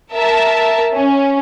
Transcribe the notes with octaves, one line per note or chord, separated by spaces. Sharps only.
A#4 E5 A5
C#4